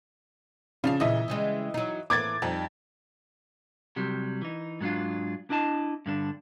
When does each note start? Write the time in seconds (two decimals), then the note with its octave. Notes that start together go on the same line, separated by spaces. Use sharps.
0.84 C#3 F3 D4 F5
1.00 A#2 C#3 E3 D#5 E5
1.28 C#3 G3 G#3
1.74 F#3 D#4
2.10 A2 E3 A#3 D6 G#6 A6
2.42 F2 G3 D#4
3.96 C3 F#3 G3
4.42 E3 D#4
4.81 G#2 F#3 D4 F4
5.50 D4 E4 D#5 A5
6.06 G2 D3 D4